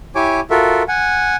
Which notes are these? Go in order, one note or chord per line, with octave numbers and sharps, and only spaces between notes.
E4 G4 C#5 G#5 D6
F4 F#4 A4 A#4 E5
F#5 G#5